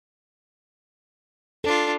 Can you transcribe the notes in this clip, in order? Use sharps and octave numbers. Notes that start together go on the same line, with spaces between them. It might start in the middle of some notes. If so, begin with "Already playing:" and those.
D4 F4 A4